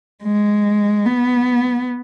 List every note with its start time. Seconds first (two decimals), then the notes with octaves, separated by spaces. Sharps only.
0.23 G#3
1.06 B3